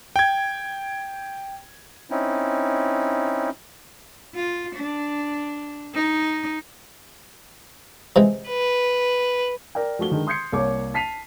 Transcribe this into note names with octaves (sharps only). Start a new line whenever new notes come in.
G5 G#6
C4 C#4 D#4 E4
F4
D4
D#4
C3 E3 G#3
B4
A#4 D5 G5
F3 A3 F#4 G7
D3 D#3 G#3
C6 D#6 G6 G#6 C7 C#7
C2 A#3 C#5 D6
A5 B6 C7 D#7 F7